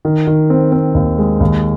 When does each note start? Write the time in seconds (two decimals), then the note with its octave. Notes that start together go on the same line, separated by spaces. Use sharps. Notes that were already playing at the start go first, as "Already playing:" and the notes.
0.05 D#3
0.27 D#3
0.50 C4
0.72 C4
0.95 D#2
1.18 G#3
1.40 D#2